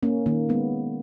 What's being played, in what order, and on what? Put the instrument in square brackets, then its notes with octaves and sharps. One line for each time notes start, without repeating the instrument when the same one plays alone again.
[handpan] A#3 C#4
D#3 A#3
G#3 B3